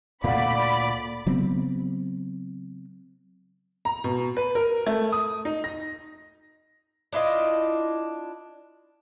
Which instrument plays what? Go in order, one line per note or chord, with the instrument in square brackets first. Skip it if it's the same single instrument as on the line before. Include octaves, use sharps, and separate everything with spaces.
[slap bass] D2 A#2 A3 [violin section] D5 B5 [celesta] F5 F#5
[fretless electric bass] C#3 F#3 B3 C4
[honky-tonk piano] A#5
B2
B4
A#4
A3
D#6
D#4
A#6
[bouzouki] D4 E4 F4 D#5